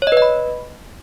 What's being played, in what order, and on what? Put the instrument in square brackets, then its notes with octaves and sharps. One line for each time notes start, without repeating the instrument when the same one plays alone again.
[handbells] C#5
D#5
B4
D#5
B5